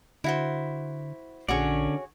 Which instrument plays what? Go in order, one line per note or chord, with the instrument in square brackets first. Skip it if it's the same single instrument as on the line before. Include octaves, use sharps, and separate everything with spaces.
[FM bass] D3 [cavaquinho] E4 F#4 C5
[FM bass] A#1 [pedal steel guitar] D3 C#4 D5 [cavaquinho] F#4 G#4 C#5